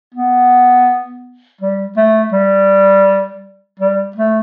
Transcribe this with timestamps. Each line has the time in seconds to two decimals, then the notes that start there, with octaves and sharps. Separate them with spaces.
0.14 B3
1.61 G3
1.97 A3
2.33 G3
3.80 G3
4.16 A3